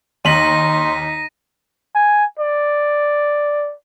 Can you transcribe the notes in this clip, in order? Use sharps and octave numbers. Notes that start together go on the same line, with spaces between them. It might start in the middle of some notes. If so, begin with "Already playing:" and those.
D#2 D#4 C6 A#6 B6 D#7 F#7
G#5
D5